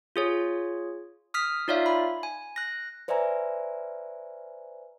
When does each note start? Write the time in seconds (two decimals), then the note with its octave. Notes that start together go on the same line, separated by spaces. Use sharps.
0.16 F4 G#4 C#5
1.34 D#6 F6 B6
1.68 D#4 F4 C#5 D5 E5 F5
1.86 B5
2.23 G#5
2.56 F#6 A#6
3.08 B4 C5 D5 E5 G#5 A#5